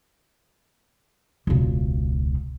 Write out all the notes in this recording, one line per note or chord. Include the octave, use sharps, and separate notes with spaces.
E1 C#2